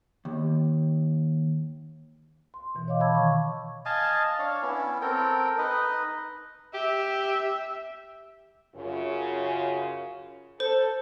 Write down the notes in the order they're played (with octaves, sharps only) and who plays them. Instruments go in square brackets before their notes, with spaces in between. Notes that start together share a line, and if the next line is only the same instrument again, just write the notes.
[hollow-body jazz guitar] D#2
[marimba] C6
B2 E3
C#5 D#5 F5 D6
D#3 A5 B5 D6 E6 G#6
C#6
[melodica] D#5 F5 G#5 A5
D4 C#5 F5
B3 C#4 E4
C4 A4 A#4 G5
D#4 B4 D#5
[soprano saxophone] G4 [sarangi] E5
[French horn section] F#2 C#3 F4
[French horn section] A4 [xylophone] C5